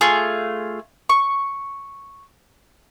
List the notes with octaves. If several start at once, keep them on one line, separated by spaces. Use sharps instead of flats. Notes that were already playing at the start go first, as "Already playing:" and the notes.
A3 F4 G#4
C#6